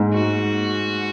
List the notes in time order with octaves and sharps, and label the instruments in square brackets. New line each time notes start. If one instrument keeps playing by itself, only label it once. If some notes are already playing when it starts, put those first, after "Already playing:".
Already playing: [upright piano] G#2
[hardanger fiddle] F#4